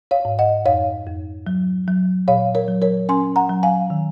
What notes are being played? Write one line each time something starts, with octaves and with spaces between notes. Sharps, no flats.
C#5 F5
G#2
D#5 F#5
F2 C#5 F5
F2
F#3
F#3
A#2 C#5 F5
A#4 C#5
F#3
A#4 C#5
C#4 G#5 C6
F#5 A#5
F#3
F5 G#5
D#3